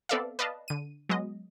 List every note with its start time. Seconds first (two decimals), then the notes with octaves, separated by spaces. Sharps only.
0.09 B3 C4 A4 D5 E5 F5
0.39 B4 D5 D#5 F5 A5
0.68 D3 D#7
1.09 F#3 G#3 B3 D#5